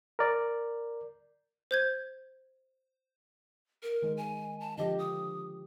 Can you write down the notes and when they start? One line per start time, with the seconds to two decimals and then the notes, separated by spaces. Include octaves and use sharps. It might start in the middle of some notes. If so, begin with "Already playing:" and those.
0.19 A#4 D5
1.71 C5 G6 G#6
3.83 A#4
4.02 D#3 G#3
4.17 G#5
4.61 A5
4.77 D3 F3 G4 D#5
4.99 D#6